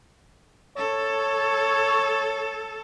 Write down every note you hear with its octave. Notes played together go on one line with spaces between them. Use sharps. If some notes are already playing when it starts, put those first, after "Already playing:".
A4 C#5